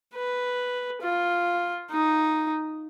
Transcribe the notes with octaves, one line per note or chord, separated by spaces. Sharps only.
B4
F4
D#4